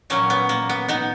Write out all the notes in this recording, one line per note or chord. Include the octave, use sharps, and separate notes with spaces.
A#2 F#3 A#3 C#4
B3
A#3
B3
B3 D#4